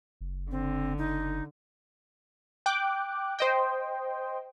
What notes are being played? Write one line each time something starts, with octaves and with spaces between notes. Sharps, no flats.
F#1
D3 C4
F#1 D#4
G5 D6 F#6
C5 D#5 G5